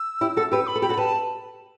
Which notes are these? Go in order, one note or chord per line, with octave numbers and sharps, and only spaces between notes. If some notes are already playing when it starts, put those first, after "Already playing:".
Already playing: E6
E4 G4
F#4 A4
G4 B4 E6
B5
A4
G4 B5
F#4 A4
G4 B4 A5